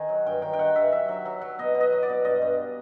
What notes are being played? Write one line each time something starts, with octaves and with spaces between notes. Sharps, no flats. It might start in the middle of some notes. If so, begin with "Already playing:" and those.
Already playing: D#3 G#5
F#3
G2 G5
D#3 G5
G5
D#3 F#5
G2 E5
F#3 E5
F#3
F#3
F#3
B2 D#5
B2
D#5
F#3
D5
B2
G2 D#5
G2